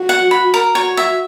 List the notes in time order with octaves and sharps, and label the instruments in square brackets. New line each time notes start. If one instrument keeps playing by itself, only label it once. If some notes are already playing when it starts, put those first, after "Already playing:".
Already playing: [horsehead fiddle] F#4
[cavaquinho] F#5
B5
A#4
[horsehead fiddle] F#4 [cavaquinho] C#5
[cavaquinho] E5